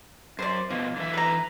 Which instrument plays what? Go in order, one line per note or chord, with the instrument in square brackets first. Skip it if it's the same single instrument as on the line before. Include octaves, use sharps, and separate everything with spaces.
[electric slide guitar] F#2 [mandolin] C5 D5
[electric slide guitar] B2 F3 [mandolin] A#3
[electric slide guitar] D3 E3 E5
[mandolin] B4 A#5